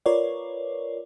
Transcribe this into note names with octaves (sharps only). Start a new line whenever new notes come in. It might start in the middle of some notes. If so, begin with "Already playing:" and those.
F4 A#4 B4 C#5 D5